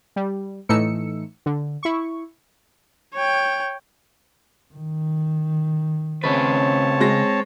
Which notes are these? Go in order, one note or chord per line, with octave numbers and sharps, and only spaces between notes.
G3
A2 E3 A3 D#4 E6 C#7
D3
E4 C#6
C#5 G5
D#3
C#3 C4 B4 C#5 A5
G#3 A#6